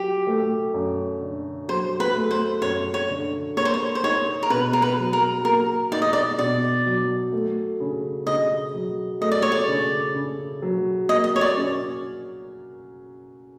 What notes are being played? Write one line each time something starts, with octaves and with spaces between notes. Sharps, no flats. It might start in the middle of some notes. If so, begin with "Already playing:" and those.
Already playing: F#3 G4
A3
F#2
D3
F#3 C5
B4
A3
C5
F#2 C#5
C#5
D3
A#3 C#5
C5
C#5
C5
D#4 C#5
A#4
B2 B4
A#4
B4
F#3
A#4
A#3 A#4
D#4 D5
D#5
D5
B2 D5
F#3
A3
C#3
C#3 D#5
F#3
A3 D#5
D5
C#5
D5
C#3
C#3
F#3
A#3 D#5
D#5
C#5
D5
C#4